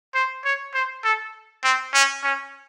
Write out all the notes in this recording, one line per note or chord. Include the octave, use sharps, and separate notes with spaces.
C5
C#5
C5
A4
C4
C#4
C#4